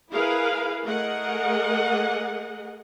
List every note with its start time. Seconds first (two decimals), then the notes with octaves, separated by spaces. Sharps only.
0.11 E4 G#4 A#4 B4 F5
0.84 A3 G#4 A#4 D#5 F#5